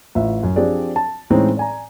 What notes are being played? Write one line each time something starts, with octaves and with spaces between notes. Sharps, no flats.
A1 F4 E5
F#2
F3 C4 D4 G4 G#4 D5
A5
A2 E3 G#3 C4 C#4 D#4
D5 G#5 A#5